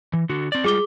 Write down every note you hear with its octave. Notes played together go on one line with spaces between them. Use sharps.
E3
D3 F#4
C4 D5
G3 G#3 F4 G#4 D6 G7